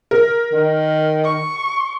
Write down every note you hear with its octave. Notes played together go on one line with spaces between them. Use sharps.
A#4
D#3
C#6